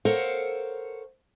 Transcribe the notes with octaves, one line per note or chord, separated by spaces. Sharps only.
A4 A#4 C5 C#5 F5 F#5